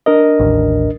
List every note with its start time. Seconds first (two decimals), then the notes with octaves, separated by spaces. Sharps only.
0.06 D4 A#4 D#5
0.40 A1 D#2